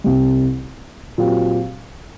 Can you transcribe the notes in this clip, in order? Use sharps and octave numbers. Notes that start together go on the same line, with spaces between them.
C2 C3 G3
A#2 F#3 C4 G4